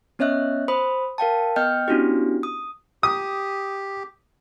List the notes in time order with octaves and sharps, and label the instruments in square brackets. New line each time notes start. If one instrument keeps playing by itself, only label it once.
[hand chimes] B3 C#4 C#5 D#5 E5 F#6
C5 B5 D#6
A#4 F5 G5 A5
B3 D#5 G5 F6 G6
B3 C#4 D4 E4 F#4 G4
D#6
[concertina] G4 [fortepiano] D#6